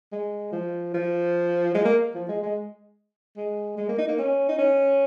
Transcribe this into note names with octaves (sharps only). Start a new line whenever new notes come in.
G#3
F3
F3
G#3
A#3
F3
G#3
G#3
G#3
G#3
A#3
D#4
A#3
C#4
D#4
C#4